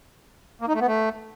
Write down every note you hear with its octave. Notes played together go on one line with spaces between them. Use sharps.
A#3
D#4
A3
B3
A3